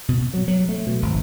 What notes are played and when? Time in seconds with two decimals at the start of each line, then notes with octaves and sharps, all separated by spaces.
0.08 B2
0.34 F#3
0.48 F#3
0.69 A3
0.87 B2
1.02 G#1